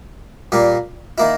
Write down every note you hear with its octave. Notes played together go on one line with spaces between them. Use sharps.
A#2 G3 A#3
D#3 A#3 E4